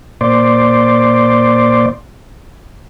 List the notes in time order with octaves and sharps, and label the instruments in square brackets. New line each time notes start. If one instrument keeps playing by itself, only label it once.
[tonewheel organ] A#2 C5 D5